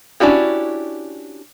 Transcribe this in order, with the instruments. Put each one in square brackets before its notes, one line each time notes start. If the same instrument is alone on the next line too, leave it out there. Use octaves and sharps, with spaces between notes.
[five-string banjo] C#4 D4 E4 F#4 G4